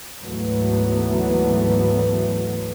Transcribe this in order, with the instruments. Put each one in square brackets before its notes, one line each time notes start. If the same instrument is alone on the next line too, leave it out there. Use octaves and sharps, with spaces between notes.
[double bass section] D2 G#2 E3 F#3 A3 B3